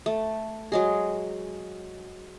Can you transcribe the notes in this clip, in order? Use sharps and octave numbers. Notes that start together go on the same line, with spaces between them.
A3
F#3 G#3 G#4